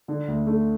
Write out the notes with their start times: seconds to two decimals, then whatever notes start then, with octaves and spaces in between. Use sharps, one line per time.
0.08 D3
0.28 D2
0.47 A3